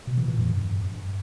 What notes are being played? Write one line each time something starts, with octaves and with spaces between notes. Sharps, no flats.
B2
E3
A#2
F2
G2